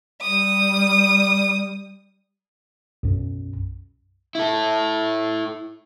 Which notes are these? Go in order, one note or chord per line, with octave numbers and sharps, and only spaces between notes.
G3 D#6
B1 F#2
E4 A4